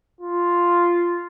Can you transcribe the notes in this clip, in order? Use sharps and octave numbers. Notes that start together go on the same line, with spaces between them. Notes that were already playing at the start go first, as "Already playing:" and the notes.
F4